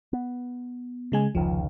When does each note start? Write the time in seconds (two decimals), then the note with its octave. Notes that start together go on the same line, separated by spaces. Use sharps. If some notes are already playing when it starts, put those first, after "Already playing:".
0.13 B3
1.12 C#3 G#3 G#5
1.35 F1 C#2 D#3 F3